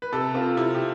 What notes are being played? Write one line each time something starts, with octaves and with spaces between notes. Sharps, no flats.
B4
C3 A4
C4 F4
C3 E4
G4